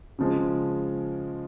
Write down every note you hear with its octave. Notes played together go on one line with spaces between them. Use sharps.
C#3 F3 G#3